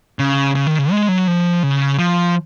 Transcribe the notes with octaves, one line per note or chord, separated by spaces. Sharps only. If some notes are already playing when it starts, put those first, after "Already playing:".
C#3
C#3
D#3
C#3
G#3
F#3
F3
C#3
F3